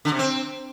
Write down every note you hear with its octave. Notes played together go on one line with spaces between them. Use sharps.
D3
C3
C4